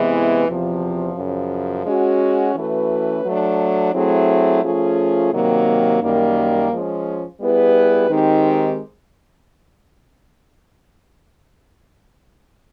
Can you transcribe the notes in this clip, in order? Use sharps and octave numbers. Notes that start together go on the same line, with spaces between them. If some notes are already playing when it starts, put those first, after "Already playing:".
Already playing: C3 E3 G#3 B3 E4
E2 C3 F3
F#2 C#3 F3
G#3 C#4 F#4
E3 A3 C#4 F#4 B4
F#3 A3 D4
F#3 A3 C4 E4 G#4
F3 A3 C#4 F4 G#4
C3 D#3 F#3 A#3
F#2 D#3 G3 A#3
F3 G#3 C#4
G3 B3 E4 G#4 B4
D#3 G#3 C4 D#4 G4